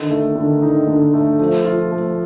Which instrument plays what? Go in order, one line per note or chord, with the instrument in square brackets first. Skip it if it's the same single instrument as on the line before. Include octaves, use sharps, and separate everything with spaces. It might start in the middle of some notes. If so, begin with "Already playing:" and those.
Already playing: [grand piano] D3 [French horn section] D#3
[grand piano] A3
D3
D#4
D3
A3
[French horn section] F3 [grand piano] A3
[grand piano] F4
A3